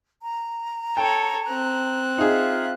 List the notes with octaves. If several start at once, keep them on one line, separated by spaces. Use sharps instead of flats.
A#5
A4 C#5 G5
C4 F#6
D#4 F4 G#4 E5